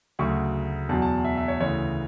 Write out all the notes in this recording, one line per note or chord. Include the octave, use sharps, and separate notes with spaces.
D2 C#3 F#3 C#6
E2 B2 F#3 A5
A5
E5
E5
C#5
D2 C#3 E3 C#5